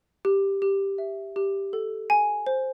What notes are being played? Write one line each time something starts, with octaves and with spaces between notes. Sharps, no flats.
G4
G4
E5
G4
A4
G#5
C5